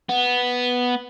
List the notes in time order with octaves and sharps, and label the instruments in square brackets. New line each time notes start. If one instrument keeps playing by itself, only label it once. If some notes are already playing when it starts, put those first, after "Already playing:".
[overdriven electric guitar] B3